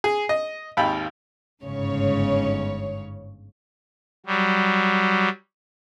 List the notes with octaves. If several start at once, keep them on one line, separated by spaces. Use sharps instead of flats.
G#4
D#5
G#1 D#2 F5 G5 B5
G1 G#2 C#3 C#5
F#3 G3